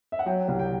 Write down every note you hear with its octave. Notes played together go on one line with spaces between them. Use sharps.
E5
F#5
F#3 G5
C2
G5